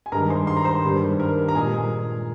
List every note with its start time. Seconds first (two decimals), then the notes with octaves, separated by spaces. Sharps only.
0.06 G#5
0.12 G2 D#3 G#3 A#4 A#5
0.30 C5 C6
0.47 C6
0.57 A#5
0.64 C5 C6
0.83 G2 D#3 G3
1.20 A#4 A#5
1.48 A#5
1.55 A#2 G#3 G#4 G#5